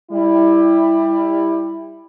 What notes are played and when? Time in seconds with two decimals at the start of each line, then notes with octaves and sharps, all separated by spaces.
0.11 G3 E4